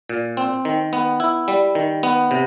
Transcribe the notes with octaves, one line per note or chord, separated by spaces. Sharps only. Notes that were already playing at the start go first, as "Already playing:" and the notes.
A#2
C4
D#3
B3
E4
G3
D#3
B3
C3